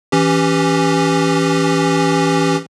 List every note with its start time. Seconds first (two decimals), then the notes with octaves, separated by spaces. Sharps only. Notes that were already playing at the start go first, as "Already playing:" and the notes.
0.12 E3 C#4 G4